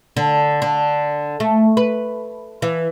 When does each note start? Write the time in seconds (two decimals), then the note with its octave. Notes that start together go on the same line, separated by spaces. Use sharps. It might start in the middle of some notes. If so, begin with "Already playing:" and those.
0.17 D3
0.62 D3
1.40 A3
1.77 B4
2.62 E3